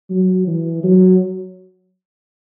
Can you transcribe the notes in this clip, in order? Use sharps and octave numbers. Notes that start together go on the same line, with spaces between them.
F#3
E3
F#3